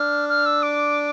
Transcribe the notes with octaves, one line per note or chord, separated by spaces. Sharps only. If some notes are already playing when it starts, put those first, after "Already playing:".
Already playing: D4 F6
F6
E6
D6